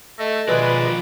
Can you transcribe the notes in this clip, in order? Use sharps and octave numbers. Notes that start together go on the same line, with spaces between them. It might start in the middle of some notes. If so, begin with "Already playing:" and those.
A3 A4 D#5
B2 D#3 F3 G#3 B4 D5 D#5